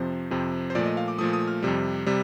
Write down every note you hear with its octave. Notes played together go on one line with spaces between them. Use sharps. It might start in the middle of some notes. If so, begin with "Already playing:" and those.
Already playing: F2 C3 F3 C4 C5
F2 C3 F3 C4
C5
A#2 F3 A3 D5
D#5
F5
D6
A#2 F3 A3 D#6
D#6
F6
F2 C3 G3
C3 G3